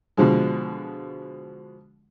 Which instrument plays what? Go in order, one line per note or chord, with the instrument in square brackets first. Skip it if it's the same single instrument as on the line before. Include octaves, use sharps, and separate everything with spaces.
[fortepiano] B2 D3 F3 G#3